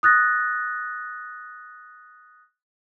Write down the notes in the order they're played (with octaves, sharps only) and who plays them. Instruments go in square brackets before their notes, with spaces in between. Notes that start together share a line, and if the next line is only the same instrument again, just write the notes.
[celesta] D#6 F#6 A6 A#6